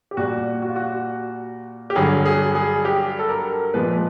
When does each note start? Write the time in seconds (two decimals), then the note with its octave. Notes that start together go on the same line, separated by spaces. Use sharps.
0.11 G4
0.17 A#2 G3 F#4
0.62 F#4
0.69 F4
0.76 F#4
1.90 G4
1.95 G2 D3 F#3 G#4
2.26 G#4
2.55 G#4
2.85 G4
3.19 A4
3.29 A#4
3.74 A#2 F3 G#3 B4
3.91 B4